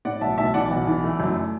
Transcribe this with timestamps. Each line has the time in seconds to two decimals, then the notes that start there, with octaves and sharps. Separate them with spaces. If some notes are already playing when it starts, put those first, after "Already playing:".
0.05 A2 D5 F#5
0.21 B1 E5 A5
0.38 B1 E5 A5
0.54 E3 D5 F#5
0.71 B1
0.87 E3
1.04 A3
1.20 F#2